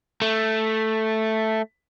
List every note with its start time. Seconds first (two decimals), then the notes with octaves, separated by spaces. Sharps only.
0.22 A3